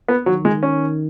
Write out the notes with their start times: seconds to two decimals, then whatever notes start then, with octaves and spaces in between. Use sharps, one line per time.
0.08 B3
0.26 D#3 F#3
0.45 G#3
0.63 C#4